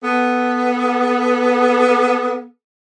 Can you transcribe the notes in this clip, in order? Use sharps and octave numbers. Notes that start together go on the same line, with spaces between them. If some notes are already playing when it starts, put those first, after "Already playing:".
B3 A4